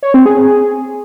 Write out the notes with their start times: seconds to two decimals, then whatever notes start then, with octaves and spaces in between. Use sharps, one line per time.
0.03 C#5
0.14 C4
0.26 G#4